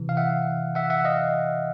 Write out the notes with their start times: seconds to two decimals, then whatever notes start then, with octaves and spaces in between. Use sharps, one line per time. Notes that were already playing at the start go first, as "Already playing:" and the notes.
Already playing: C3 E3
0.09 F5
0.17 E5 F#5
0.75 E5 F#5
0.90 E5 F#5
1.05 D#5 F5